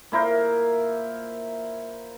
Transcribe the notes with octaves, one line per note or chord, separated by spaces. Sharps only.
A#2 E4 A#4 C5